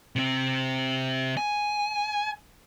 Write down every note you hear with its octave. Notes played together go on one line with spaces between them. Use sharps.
C3 C4
G#5